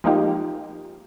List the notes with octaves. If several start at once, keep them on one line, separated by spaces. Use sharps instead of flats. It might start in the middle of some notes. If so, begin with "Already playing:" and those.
F3 G#3 A#3 D#4 F4 G4